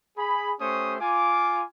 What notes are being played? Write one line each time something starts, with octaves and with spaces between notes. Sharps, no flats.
G#4 B5
A3 C#4 G4 C5 C#6 D#6
F4 G#5 D6